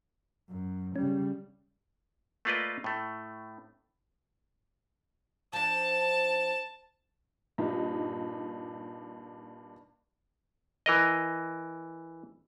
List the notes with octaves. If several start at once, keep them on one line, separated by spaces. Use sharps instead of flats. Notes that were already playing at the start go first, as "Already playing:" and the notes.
F#2
C#3 G3 C#4
A3 A#3 F4 B4 D5 D#5
A2 A3
F3 D4 A5
G2 A#2 D#4
E3 A#4 D#5